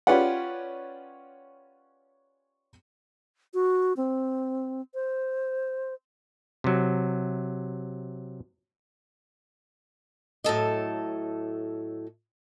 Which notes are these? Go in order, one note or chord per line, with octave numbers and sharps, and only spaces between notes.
C#4 F4 G4 B4 D5 F#5
F#4
C4
C5
C3 F#3
A2 F#3 A4 D#5